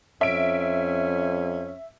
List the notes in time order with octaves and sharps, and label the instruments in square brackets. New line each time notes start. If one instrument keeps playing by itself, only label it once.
[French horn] F2 [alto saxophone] C#4 [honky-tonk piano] E5 D7